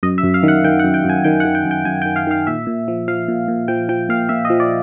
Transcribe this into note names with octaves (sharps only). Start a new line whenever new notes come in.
F#2 D#5
E5
F#2
F5
D#3
F#5
D#3 G5
F#5
F#2
G5
F#2
G#5
D#3 G5
F#5
D#3
G5
F#2
G5
F#2 G#5
G5
D#3
F5
D#3 F5
A#2 E5
A#2
F3
F3 F5
A#2
A#2
F3 G5
F3 G5
A#2 F5
A#2 E5
D#5
F3
D5